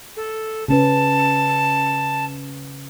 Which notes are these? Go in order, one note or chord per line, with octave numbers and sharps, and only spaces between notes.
A4
C#3 C#4 B4 A5